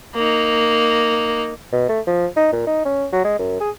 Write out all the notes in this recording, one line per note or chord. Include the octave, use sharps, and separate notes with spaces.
A#3 D#4
B2
A3
F3
D#4
A#2
D#4
C#4
F#3
G#3
F#2
G#4